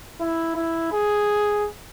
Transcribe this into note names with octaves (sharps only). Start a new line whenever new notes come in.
E4
E4
G#4